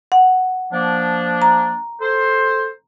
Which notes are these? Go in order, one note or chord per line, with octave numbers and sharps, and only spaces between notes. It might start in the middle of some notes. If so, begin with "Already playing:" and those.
F#5
F3 A#3 D4
A#5
A4 C5